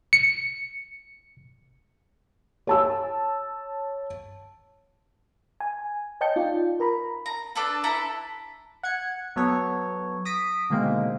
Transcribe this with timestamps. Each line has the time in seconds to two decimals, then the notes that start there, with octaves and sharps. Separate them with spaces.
0.13 C#7
2.67 C#5 A5 E6
5.60 G#5
6.21 C#5 D#5 G5 A5 G6 C#7
6.36 D#4 F4 D5
6.80 A#4 A#5 B5
7.26 A#5
7.55 D4 A4 B4
7.84 E4 A4 B4 A#5
8.83 F#5 G#6 C#7
9.36 F#3 B3 A4 C#5
10.25 D#6 A#6 B6 D7
10.70 B2 D3 D#3 G#3 A#3 C4